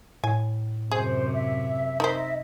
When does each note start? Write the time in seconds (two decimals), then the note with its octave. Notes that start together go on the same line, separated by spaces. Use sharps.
0.24 A2 G#5
0.91 F#2 C3 G#4 C5
1.33 E5
2.00 D#4 A#4 C5 D#5 E5